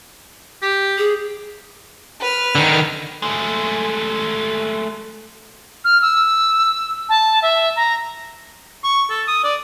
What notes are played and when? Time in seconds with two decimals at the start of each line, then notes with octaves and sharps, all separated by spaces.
0.62 G4
0.98 G#4
2.20 B4 F6
2.55 D3 D#3
3.22 G#3 A3
5.84 F6
6.02 E6
7.09 A5
7.42 E5
7.76 A#5
8.84 C#6
9.10 A4
9.28 D#6
9.44 D5